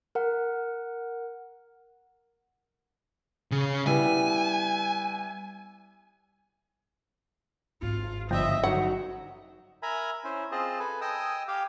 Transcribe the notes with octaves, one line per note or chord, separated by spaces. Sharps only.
A#4 F#5
C#3
G3 B3 E4 G#5
G#1 G#2 F4
G1 F3 D#5 E5 G5
F#3 D#4 C#5 F#5
A#4 E5 G#5 A#5 B5
C#4 E4 C5
C4 F4 G#4 C5 D#5 A5
A4 B4 G#5
D#5 G5 G#5 D#6 E6
G4 F5 G5